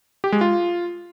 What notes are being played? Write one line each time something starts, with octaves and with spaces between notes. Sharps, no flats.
G4
G#3
F4